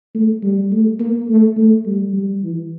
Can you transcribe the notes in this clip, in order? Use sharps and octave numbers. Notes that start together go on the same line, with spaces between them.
A3
G3
A3
A#3
A3
A3
G3
G3
E3